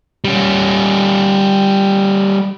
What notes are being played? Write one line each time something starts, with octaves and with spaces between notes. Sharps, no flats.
G3 C#4